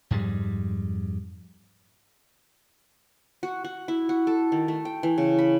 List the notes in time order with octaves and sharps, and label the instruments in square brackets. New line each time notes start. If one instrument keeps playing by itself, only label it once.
[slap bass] F2 G#2 G3 G#3
[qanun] F#4
F#4
E4
F#4
A4
D#3
A3
G5
E3
C#3
B5